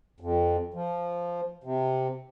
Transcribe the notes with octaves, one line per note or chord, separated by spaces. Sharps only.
F2
F3
C3